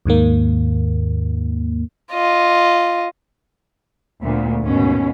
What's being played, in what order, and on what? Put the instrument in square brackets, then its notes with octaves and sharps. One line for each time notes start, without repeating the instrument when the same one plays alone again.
[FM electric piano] D#2 G#2 D#3 A#3
[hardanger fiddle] F4 D#5
[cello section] D2 A#2 B3
D#2 G#2 B2 C#4